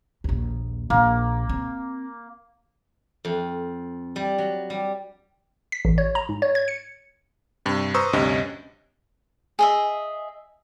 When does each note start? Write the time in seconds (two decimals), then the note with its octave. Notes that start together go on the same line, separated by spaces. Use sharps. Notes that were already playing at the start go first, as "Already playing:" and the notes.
0.24 A#1 D#2
0.90 A#1 A#3
1.49 C4
3.25 F2
4.16 G3
4.38 F#3
4.70 G3
5.72 B6
5.85 A1
5.98 C#5
6.15 A#5
6.29 G#2
6.42 C#5
6.55 G#6
6.68 C#7
7.65 G2 C3
7.94 B4 C5 A#5 C#6 D#6 E6
8.13 D2 G2 C3 C#4 D#5
9.59 G#4 D#5 E5